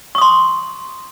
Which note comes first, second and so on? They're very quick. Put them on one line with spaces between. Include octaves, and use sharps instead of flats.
C#6 D#6 C6